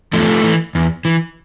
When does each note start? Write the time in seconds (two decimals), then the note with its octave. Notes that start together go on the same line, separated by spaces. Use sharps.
0.13 E2 F3 A3
0.44 E3
0.75 E2
1.05 E3